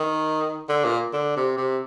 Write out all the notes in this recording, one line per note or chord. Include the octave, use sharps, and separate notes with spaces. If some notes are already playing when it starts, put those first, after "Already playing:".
Already playing: D#3
D3
A#2
D3
C3
C3